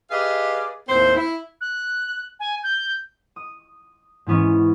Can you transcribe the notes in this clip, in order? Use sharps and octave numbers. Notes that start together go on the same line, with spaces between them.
G4 G#4 B4 D5 D#5 F5
D#2 A2 C4 C5
E4
F#6
G#5
G6
D#6
G#2 E3 B3 C#4